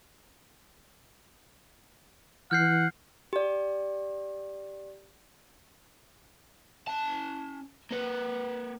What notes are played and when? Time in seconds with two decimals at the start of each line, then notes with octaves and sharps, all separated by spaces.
2.51 E3 F#5 F6 G6 C7
3.33 G4 D5
6.88 C#4 A5
7.91 A#3 B4